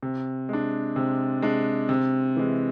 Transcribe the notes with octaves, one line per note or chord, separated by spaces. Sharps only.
C3
G#3 D4
C3
G#3 D4
C3
E3 G#3